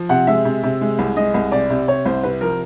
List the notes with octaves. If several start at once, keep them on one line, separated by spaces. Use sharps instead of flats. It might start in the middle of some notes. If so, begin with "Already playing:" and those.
Already playing: F3
C3 F#5
G#3 E5
C3
C3
G#3
C2
G#3 D#5
C2
C3 D5
C3
C3 C#5
C2 C5
C3 B4
F3 A#4